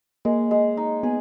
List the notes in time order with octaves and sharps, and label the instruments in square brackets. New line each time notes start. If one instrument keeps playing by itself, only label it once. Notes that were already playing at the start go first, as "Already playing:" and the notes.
[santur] G#3 [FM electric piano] A#3
[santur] G#3
D#4
[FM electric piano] B3 [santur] G#4